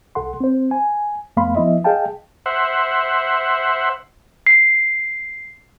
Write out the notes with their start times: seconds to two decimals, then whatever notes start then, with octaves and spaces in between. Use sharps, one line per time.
0.15 C2 A4 F#5 C6
0.40 C4 C5
0.71 G#5
1.37 F2 A3 B3 F5 B5 C6
1.55 F3 B3 E4 D#5 E5
1.84 G#4 D#5 F5 G5 A5
2.46 C5 E5 F#5
4.47 C7